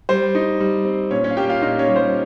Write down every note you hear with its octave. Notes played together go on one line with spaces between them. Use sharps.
G3 C5
D#4
G3
C4
A#2 C#4 C#5
C#4 C#5
F5
A#3 G4 G5
F4 F5
A#2 D#4 D#5
C#4 C#5
G3
C5